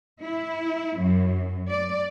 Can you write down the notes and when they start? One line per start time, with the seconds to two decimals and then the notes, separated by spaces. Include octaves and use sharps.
0.21 E4
0.98 F#2
1.69 D5